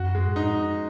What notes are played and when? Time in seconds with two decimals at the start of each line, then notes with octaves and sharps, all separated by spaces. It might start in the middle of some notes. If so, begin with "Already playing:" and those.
Already playing: F#2 F#4
0.15 G#3
0.27 A2
0.36 D#4